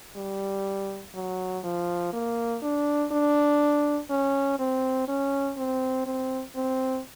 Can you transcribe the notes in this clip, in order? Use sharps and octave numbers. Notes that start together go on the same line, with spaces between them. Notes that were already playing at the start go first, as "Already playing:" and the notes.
G3
F#3
F3
A#3
D4
D4
C#4
C4
C#4
C4
C4
C4